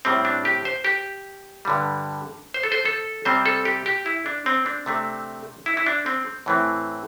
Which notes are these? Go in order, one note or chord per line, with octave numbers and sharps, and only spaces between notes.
A2 G3 C4
D4
G4
C5
G4
G2 D3 G3
C5
A4
C5
A4
C3 G3 C4 C5
A4
G4
G4
E4
D4
C4
D4
C3 A3 C4
E4
E4
D4
C4
A2 E3 A3 C4